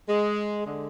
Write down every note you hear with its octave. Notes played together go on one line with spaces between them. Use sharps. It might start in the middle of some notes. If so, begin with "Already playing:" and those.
G#3
D3 G#3